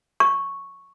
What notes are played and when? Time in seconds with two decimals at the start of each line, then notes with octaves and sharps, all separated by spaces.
0.20 C#6